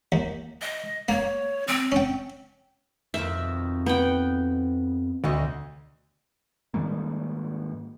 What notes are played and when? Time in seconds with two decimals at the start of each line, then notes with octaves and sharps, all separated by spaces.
0.12 D#2
0.61 D#5
1.09 A#3 C#5
1.67 C4
1.92 C#4 G5
3.14 F2 B2 D#3 E5
3.86 B3 G5
5.24 D2 B2 F#4 D#5
6.74 G#2 D#3 G3 A#3